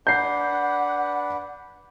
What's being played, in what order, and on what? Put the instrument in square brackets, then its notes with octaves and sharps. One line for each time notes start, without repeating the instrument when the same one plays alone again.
[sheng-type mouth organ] D4 B4 [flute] F#5 [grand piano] G6 C7